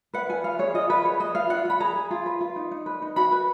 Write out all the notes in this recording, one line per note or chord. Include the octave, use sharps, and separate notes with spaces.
B4 F#5
F4 G#5
B4 F5
G#4 C#5
F4 D#5
F4 B4
G#4 C#5
B4 D#5
F4 F5
F4 F#5
F4 B5
G#4 A#5
G#4
F4
B4
F4
D#4
D#4
B4
D#4
F#4 B5
B4